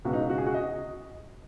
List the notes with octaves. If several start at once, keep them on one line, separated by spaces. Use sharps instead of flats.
C#2 B2 F#4
D#4
F#4
G#4
F#4
D#5